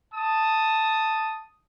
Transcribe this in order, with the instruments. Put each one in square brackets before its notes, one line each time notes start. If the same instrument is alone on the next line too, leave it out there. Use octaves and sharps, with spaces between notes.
[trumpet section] A5 D#6